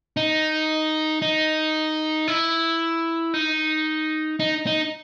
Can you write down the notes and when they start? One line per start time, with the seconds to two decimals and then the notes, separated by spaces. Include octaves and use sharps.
0.17 D#4
1.22 D#4
2.28 E4
3.34 D#4
4.40 D#4
4.67 D#4